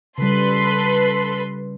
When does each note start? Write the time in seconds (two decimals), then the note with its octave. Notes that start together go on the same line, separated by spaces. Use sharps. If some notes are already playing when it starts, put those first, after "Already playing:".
0.18 C#3 G3 A4 B4 C6